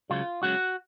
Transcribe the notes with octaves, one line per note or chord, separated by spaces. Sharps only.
C#2 C#3 F#3 F4
C#2 C#3 F#3 F#4